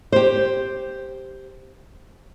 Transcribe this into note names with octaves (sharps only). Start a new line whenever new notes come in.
G4 C5